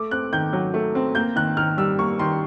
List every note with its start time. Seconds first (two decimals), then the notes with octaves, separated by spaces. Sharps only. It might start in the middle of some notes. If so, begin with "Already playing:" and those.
Already playing: A3 D6
0.11 C4 F#6
0.33 D#3 G6
0.53 F#3
0.74 A3
0.95 C4
1.15 A#3 G6
1.36 D#3 F#6
1.57 D#3 F6
1.77 G3 E6
1.99 A#3 C#6
2.19 D#3 C6